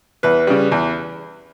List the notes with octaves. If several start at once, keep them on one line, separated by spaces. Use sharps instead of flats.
E2 B4
C#3 G3
E2